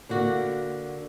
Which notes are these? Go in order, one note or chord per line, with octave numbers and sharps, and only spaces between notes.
D3 A#3 F#4